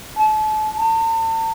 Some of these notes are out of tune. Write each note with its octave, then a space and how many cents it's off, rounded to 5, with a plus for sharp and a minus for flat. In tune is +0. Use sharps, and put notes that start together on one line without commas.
A5 -35
A5 +40